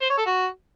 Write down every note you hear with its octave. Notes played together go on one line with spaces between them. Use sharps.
C5
C#5
A4
F#4